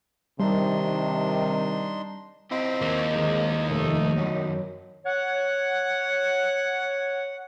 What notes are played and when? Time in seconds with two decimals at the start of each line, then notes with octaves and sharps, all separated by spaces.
0.40 C3 D#3 G3 D4 D#4 C6
2.51 C4 E4 F4 D#5
2.82 D#2 A#3
3.11 G2 D#3 G#3 C4 D#4
3.67 F1 A3
4.18 F#2 D#3 F#3 B3
5.05 C#5 F#5